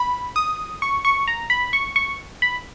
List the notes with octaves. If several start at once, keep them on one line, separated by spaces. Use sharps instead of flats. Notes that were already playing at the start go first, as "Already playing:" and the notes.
Already playing: B5
D#6
C#6
C#6
A#5
B5
C#6
C#6
B5